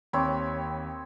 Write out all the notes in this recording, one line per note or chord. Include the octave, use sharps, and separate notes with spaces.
D#2 C4 C#5 B5 D6